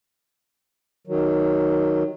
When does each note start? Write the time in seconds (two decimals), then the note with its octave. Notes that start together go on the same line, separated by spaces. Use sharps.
1.07 D#3 F#3